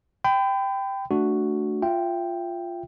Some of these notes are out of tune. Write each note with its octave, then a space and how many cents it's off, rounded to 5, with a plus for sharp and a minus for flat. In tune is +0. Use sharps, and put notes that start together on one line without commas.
G5 +0 B5 +40
A3 +0 D4 +0 F#4 +0
F4 +0 E5 +30 G5 +0